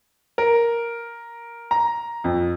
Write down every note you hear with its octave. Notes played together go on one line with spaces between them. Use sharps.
A#4
A#5
F2